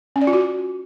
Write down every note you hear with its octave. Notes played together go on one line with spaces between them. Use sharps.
C#4
D5
F4
F#4